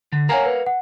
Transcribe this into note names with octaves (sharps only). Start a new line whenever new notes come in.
D3
A#4 C#5 F5 F#5 G#5 A#5
B4
F#5